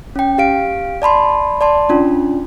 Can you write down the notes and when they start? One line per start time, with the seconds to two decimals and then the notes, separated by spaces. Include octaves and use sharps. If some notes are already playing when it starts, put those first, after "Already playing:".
0.16 C#4 G5
0.38 G4 F5 D7
1.02 D5 A5 B5 C6
1.61 D5 A5 C6
1.89 C#4 D4 F4